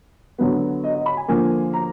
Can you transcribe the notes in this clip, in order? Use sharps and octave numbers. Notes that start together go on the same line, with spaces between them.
D3 F#3 B3
D#5
D#5
B5
G#5
D3 F3 A#3 G#5
A#5